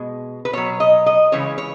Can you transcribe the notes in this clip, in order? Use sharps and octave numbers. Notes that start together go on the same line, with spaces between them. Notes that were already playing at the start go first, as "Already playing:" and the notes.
Already playing: B2 G#3
B4
B2 F#3 C#5
D#5
D#5
C#3 E3 G#3 C#5
C#5